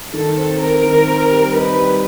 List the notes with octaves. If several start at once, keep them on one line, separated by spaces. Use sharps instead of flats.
D#3 A4
C4
C4 A#4
D#3
C4
G3
D#4 B4
G3